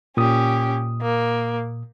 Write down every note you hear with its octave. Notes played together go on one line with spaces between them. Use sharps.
A#2 C#4 G4 D#6
A#3